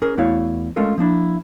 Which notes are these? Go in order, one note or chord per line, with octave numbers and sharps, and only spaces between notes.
C#4 G#4 A#4
E2 A3 E4 F#4 C#5 F5
G#3 A3 C#4 F4 A4 A#4
F3 A#3 D4 E4